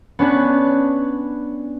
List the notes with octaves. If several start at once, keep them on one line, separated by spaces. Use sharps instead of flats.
B3 C#4 D4 B4